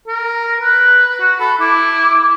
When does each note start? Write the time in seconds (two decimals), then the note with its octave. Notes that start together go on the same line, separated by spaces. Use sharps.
0.08 A#4
0.61 B4
1.20 F#4
1.40 A4 B5
1.60 E4 D6